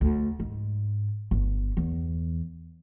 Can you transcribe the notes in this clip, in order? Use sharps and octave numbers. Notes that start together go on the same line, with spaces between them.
D2
G#2
G1
E2